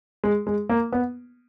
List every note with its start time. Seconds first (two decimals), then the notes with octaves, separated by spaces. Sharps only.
0.24 G#3
0.47 G#3
0.69 A#3
0.93 B3